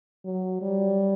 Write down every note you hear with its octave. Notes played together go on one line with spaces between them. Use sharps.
F#3
G3